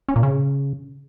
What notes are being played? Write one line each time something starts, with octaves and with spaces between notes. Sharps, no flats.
C#4
A#2
C#3